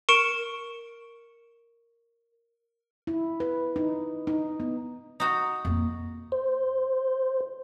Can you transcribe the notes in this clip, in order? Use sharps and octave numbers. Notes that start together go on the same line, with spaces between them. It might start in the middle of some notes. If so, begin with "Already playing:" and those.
A#4 C#6 C#7 D7 E7
E4
B4
D#4
D#4
B3
D#4 F#4
F2 A#3
C5